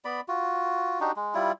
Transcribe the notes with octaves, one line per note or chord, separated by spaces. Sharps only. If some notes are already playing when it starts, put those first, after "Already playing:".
B3 D5 B5
F4 F#4
D4 D#4 F#4 G4
G#3
G3 E4 F4